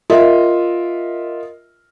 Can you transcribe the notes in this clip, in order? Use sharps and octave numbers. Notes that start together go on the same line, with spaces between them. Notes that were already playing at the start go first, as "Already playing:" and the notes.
F4 A#4 D#5 E5